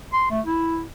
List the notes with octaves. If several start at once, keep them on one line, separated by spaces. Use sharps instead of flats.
C6
A3
E4